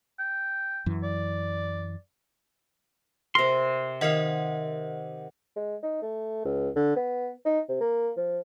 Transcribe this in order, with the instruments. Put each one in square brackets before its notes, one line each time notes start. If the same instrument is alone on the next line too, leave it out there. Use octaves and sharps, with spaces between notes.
[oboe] G5
[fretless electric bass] F#2 E3
[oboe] D5
[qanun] C3 A#4 [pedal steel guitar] C6
[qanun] D#3 F5 [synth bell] A#4 D#5 F#5
[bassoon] G#3
D#4
A3
C#2
D3
B3
D#4
C3
A#3
F3